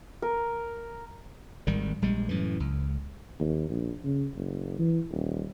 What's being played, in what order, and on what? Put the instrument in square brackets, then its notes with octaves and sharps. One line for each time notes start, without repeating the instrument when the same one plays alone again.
[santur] A#4
[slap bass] G#1 D#3 G3
A#1 G3 G#3
F#2 A2 E3
C#2
[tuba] D#2
A#1
C#3
F#1
E3
D#1